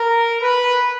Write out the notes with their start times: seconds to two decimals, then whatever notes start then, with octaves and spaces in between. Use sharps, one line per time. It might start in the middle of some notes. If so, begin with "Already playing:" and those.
Already playing: A#4
0.40 B4